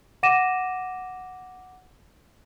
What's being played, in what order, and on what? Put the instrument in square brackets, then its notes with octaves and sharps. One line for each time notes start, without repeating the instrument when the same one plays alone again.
[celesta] F#5 D6 A#6 D#7 E7